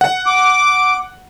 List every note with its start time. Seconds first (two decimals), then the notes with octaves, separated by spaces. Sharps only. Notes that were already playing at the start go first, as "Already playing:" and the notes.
0.01 F#5
0.26 D6